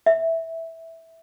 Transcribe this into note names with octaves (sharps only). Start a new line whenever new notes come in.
E5